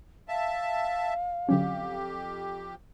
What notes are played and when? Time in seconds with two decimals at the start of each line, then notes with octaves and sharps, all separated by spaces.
0.28 E5 F5 A5
1.49 F2 D3 F#3 C#4 G4